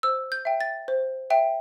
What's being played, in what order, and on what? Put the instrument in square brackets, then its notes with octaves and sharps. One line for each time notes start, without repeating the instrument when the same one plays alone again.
[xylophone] C5 E6
G6
E5 G5
A6
C5
E5 G5